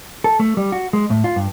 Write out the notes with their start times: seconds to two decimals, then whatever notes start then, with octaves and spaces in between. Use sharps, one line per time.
0.24 A4
0.40 A3
0.57 G3
0.72 F#4
0.93 G#3
1.10 A2
1.24 F4
1.36 G2